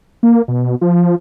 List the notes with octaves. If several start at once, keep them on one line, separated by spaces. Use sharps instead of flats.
A#3
B2
F3